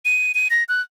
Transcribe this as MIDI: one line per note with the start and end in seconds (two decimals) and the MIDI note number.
0.05 0.32 99
0.35 0.48 99
0.50 0.63 94
0.69 0.81 90